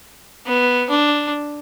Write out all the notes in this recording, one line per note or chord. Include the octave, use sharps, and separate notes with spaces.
B3
D4